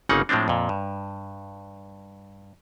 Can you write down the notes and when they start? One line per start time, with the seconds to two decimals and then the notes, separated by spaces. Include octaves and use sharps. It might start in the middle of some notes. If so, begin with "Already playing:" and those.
0.09 G1 C#3 A#3 D#4 F#5
0.29 A2 F3 G#3 C4 D4
0.48 F2 A#2
0.69 G2